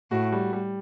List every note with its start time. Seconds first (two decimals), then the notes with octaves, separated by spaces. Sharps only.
0.11 A2 F#4
0.32 G3
0.53 G3